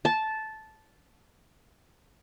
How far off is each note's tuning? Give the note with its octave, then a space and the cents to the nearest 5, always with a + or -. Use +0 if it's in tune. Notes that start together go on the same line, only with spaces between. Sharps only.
A5 -10